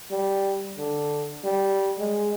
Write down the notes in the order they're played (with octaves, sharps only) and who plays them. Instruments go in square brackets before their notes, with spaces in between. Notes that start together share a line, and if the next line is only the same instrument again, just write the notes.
[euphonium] G3
D3
G3
G#3